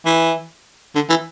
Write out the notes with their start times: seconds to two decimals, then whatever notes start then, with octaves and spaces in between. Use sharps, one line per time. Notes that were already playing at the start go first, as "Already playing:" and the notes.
0.06 E3
0.96 D3
1.10 E3